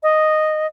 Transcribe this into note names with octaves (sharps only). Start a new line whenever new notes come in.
D#5